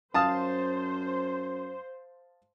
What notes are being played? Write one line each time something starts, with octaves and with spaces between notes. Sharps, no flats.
F#2 C5 F5 A5 D#6